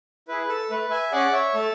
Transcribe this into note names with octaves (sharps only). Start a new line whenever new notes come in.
E4 G#4 B4
A4
A3 B4
E5 G#5
C#4 G#4 D5 F#5
C#5 E5
A3 A4